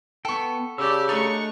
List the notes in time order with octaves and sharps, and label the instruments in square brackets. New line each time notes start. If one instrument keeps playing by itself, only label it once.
[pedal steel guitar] B3 G5 [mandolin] A4 C#6
[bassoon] C#3 [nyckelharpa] G4 D5 [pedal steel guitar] E6
[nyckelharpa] A3 C#6 [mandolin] D4 D#5 [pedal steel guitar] A#5